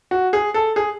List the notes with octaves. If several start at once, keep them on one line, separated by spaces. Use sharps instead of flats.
F#4
G#4
A4
G#4